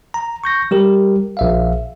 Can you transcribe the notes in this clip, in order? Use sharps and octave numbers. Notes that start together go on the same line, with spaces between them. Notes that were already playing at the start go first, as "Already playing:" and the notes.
A#5
C#6 G6 A#6
G3 G4 A#4
A#1 E5 F5